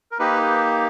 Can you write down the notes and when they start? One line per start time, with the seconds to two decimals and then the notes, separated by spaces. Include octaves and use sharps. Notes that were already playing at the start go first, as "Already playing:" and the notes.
0.12 A#4
0.19 A#3 D#4 G4 B4